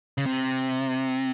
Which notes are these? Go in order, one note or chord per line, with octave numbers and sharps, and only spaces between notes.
C#3
C3